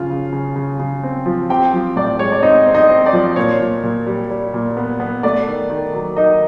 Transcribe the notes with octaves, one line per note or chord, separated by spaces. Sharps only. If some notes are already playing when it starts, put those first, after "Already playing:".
Already playing: C#3 F3 F4
C#3
C#3
C#3
C#3
C4
F3
C4 G4 G5
F3
A2 D5
G#3 C#5
D5
C4 D#4 D#5
C4
D#4 D#5
C4
D5
F3
A#2 C#5
A#2
A#2
G3
G3
A#2
B3
B3
A3 D5
D#3
D#3
F#3
D#3 D#4 D#5